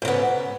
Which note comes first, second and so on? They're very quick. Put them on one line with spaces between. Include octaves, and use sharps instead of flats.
G#2 C#3 B3